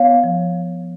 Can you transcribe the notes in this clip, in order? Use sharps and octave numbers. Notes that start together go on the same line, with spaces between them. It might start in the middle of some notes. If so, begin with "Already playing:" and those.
Already playing: B3 C#5 F5
F3